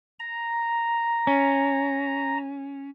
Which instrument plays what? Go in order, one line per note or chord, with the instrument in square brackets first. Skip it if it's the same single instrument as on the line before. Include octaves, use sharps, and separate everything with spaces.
[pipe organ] A#5
[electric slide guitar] C#4